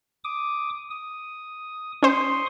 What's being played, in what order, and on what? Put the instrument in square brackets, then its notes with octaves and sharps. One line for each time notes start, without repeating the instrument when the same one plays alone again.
[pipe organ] D6 D#6
D#6
[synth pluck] C#4 C5 [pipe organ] C6 C#6 D#6